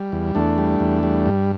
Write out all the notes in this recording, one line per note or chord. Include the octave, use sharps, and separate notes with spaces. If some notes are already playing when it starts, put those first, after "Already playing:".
Already playing: G3
E2
E2 A3 D4
G3
E2
G3
G2